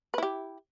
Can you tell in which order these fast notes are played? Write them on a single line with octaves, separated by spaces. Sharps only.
B4 E4 G4